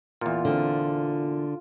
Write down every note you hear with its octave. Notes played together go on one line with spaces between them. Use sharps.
E2 A#2 F4
D3 C4